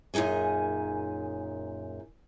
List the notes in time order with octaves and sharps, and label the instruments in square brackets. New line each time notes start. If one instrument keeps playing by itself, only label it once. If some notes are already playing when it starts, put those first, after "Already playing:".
[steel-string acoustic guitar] F#2 A#2 D#4 G#4 G#5